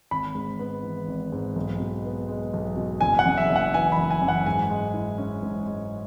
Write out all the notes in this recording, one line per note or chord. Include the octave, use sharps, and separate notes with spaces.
G#1 B5
G#2
B3
E3
G#1
G#2
B1
B2
B3
G#3
B1
B2
F#1 G#5
F#5
F#2
E5
F#1
F#5
E3 G#5
B5
F#1
G#5
F#2
F#5
G#2 G#5
G#3
E4
C#4
G#2
G#3